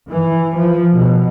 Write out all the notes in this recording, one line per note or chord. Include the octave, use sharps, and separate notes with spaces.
E3
F3
B2